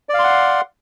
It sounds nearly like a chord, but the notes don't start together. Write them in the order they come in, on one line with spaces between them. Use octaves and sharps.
D5 F5 C6 F#5